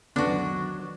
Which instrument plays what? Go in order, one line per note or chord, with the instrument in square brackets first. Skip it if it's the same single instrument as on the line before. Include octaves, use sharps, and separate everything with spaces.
[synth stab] C#2 F#2 D3 [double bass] D#3 F#3 [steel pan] B3 [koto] D4 F#4